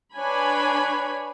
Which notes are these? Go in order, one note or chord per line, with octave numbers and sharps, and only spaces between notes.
D4 B4 C#5 G#5 B5